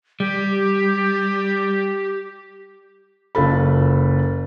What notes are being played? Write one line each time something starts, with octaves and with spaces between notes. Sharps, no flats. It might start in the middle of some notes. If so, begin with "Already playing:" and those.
G3 G4
F#1 F4 A4 B5